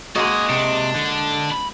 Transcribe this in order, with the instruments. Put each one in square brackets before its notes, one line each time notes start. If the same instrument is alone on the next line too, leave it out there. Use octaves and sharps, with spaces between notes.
[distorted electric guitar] F2 G#4 [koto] G#3 A#3 F#4 [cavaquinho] D#5
[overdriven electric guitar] C3 [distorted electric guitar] D4
[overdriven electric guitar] D3
B5